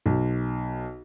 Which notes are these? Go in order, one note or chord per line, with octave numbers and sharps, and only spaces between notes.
B1